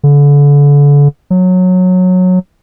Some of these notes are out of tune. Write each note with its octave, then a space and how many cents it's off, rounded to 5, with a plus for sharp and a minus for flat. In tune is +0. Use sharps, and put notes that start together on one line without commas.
D3 -35
F#3 -15